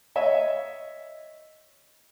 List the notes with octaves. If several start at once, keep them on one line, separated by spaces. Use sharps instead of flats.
C#5 D#5 E5